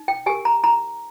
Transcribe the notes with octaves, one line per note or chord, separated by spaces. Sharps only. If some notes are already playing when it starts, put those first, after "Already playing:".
Already playing: D#4
G5
G4 A#4 G#5
A#5
D#4 A#5